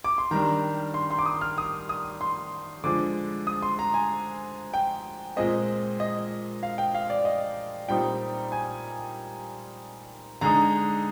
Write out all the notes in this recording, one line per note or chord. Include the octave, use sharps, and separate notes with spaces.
D6
C6
D#3 G3 D4 A#5
C6
C6
D6
D#6
F6
D#6
D#6
C6
D3 F3 G#3 D6
D#6
C6
A#5
G#5
G5
A#2 G#3 C4 D#5
D#5
F5
G5
F5
D5
D#5
A#2 G3 C4 D#4 G5
G#5
D3 G#3 D#4 A#5